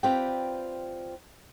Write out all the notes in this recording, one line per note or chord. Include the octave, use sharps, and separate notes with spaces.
C4 F4 G4 B4 D5 G5